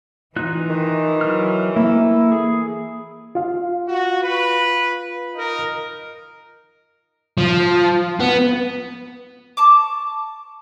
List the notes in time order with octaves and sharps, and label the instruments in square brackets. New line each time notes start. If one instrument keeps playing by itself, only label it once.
[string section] E3 [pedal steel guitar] D#4 F4 F#6
[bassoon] D#3
[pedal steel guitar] F#3 F6
[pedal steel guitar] A#3 A4 [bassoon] E4
[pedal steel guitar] G#4
[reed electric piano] F4 F5
[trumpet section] F#4
B4
D#4 A#4
[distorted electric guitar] F3
B3
[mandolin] A5 C#6 D6